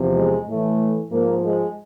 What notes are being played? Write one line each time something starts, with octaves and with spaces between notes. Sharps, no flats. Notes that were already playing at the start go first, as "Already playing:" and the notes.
Already playing: E2 C3 F3
G#3
A2 E3 A3
G#2 F3 A#3
G#3